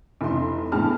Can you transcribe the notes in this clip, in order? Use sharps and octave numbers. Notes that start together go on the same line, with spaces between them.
F1 E3 D4 C6
E2 A2 G#3 A5 F6